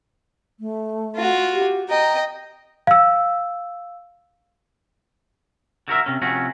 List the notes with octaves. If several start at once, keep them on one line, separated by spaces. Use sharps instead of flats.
A3
F4 F#4
G4
D#5 G5 A#5
F5 E6
D3 F#4 A#4 E5
C3 C#4
C3 F3 A3 C#4 F#4